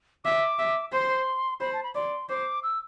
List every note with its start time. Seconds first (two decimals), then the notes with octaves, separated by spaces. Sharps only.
0.24 E5 D6
0.59 E5
0.92 C5 C6
1.60 C5 B5
1.73 A5
1.83 B5
1.95 D5 C6
2.29 C5 D6
2.63 E6